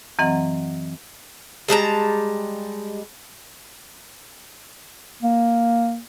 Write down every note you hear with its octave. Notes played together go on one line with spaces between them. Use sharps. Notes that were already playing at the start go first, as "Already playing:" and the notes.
F#2 E3 F#3 C4 D#5 F#5
G3 G#3 A5 A#5
A#3